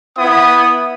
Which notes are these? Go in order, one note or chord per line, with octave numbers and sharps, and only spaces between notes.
B3 E4 D#6